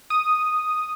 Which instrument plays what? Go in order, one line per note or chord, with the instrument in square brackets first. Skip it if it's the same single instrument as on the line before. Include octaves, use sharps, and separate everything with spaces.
[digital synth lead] D#6